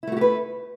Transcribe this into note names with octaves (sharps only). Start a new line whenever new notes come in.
A3 E4 F#4 G4 B4